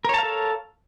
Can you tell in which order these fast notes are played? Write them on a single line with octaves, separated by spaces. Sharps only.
A#4 C#5 A5 F5 A4